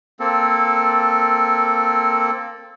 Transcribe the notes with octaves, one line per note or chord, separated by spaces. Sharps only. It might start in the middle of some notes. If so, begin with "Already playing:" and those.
A#3 C4 A4